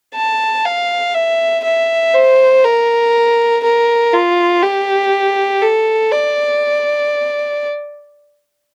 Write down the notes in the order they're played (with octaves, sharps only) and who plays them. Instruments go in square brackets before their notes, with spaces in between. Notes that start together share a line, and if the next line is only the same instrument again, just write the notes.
[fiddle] A5
F5
E5
E5
C5
A#4
A#4
F4
G4
A4
D5